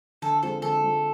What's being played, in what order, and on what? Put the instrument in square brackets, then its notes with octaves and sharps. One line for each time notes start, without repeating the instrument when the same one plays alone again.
[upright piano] D3 [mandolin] A4
[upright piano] G#3 C4 F4 [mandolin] A4
[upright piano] D3 [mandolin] A4
[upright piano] G#3 C4 F4